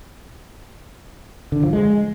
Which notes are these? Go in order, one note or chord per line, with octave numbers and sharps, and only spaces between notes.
D3
F3
G#3